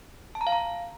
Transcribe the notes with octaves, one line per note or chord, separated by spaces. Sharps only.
A5
A#5
F5
A#5